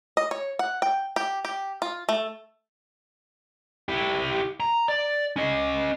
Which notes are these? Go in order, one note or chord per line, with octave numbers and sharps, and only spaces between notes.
D#5
C#5
F#5
G5
G4
G4
F4
A3
E4 G4
A#5
D5
C#4 D#5